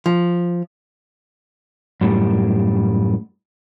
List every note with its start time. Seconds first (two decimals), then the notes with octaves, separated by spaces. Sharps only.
0.06 F3
2.01 F#2 A2 G3